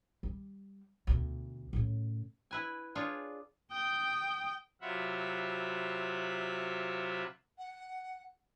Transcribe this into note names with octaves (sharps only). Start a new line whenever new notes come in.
G3
D2 B2
A2 C#3
E4 B4 G#5
D4 F4 G#4 C#5
G5 D#6 G6
C3 F#3 F4 E5 F#5 B5
F#5